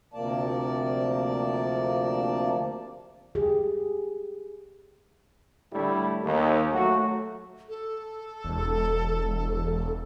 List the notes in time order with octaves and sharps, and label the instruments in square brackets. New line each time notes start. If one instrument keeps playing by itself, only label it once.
[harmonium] D2 C3 F3 A#3 D5 A5
[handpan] G4 G#4
[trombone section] A2 D3 G3 A3 E4
D#2
F#3 A3 F#4
[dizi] A4
[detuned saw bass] E1